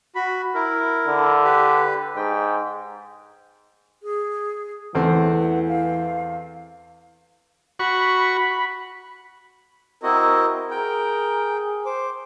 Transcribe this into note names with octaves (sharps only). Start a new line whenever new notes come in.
F#4 B5
E4 A#4
D3
G4 B4
G#2 G5
G#4
E2 E3 A3 C4 F#5
F5
F#4 B5 C#6
C4 E4 F#4 A#4 D#5
G#4 A#4 G5
C5 D6